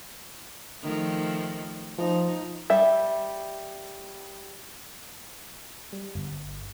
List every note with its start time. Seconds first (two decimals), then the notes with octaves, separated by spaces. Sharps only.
0.83 D#3 F3 A3
1.98 F3 D#4
2.70 G3 E5
5.93 G3
6.15 G1